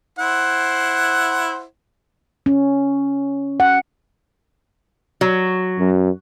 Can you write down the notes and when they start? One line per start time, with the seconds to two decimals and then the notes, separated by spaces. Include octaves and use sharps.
0.19 E4 C5 F#5
2.46 C#4
3.60 F#5
5.21 F#3
5.80 F#2